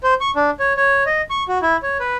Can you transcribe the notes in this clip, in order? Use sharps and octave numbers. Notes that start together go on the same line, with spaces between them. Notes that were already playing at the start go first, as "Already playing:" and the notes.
C5
C#6
D4
C#5
C#5
D#5
C#6
F#4
E4
C#5
B4